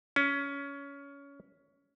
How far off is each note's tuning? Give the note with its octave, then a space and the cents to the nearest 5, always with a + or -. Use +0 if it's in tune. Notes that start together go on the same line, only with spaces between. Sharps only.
C#4 +20